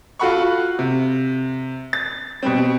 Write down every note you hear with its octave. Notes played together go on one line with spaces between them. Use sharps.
F4 F#4 A4 F#5 B5 C#6
C3
A6
B2 G3 C4